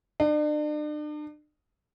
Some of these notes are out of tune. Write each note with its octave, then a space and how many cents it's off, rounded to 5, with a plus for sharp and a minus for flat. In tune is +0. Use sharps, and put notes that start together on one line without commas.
D4 +40